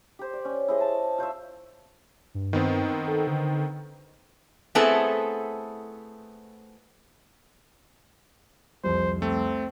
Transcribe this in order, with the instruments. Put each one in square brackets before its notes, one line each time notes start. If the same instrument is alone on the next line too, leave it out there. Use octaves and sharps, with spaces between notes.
[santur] G4 C5
D5
C#4
E4 G#4 C5 D#5
A5
F4 C5 C#5 E5
[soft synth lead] G2
[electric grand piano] D#3 B3 C4
[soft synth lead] A4
D3
[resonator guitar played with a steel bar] A3 B3 C4 E4 G#4 A4
[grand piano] C2 F2 [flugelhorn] C5
[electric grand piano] A3 [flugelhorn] C4